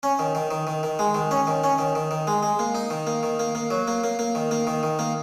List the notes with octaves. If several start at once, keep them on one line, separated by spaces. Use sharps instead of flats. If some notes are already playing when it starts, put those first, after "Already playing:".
C#4
D#3
D#3
D#3
D#3
D#3
G#3
D#3
C#4
D#3
C#4
D#3
D#3
D#3
G#3
G#3
A#3
D#4
D#3
A#3
D#3
A#3
A#3
F#3
A#3
A#3
A#3
D#3
A#3
D#3
D#3
A#3